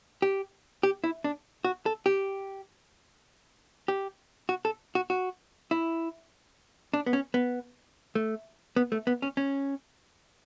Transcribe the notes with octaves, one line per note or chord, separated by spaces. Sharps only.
G4
G4
E4
D4
F#4
A4
G4
G4
F#4
A4
F#4
F#4
E4
D4
B3
C#4
B3
A3
B3
A3
B3
C#4
C#4